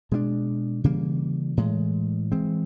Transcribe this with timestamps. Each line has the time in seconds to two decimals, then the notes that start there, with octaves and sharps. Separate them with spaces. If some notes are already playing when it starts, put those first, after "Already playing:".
0.12 B2 G#3 B3 D4
0.84 C#3 E3 G3 A#3
1.57 A2 E3 G#3
2.32 E3 G#3 C4